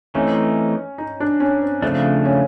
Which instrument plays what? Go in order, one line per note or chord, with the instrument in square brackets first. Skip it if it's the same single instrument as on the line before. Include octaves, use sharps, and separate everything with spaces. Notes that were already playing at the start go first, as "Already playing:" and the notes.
[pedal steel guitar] E3 A3 C4 D#4 [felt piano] C#4
[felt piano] D#4
D4
C#4
C4
[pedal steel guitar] C#3 F3 A3 D4 [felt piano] C4
[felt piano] C#4